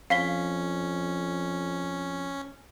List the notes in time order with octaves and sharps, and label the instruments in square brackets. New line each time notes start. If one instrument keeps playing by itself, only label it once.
[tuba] F2 [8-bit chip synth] C#4 [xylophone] F5 B6 G7